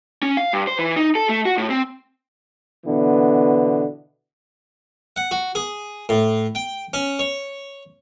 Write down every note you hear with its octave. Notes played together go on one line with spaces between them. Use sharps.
C#4
F5
G2
C5
E3
D#4
A4
A3
F#4
A2
C4
B2 D3 E3 B3
F#5
F#4
G#4
A2
G5
C#4
C#5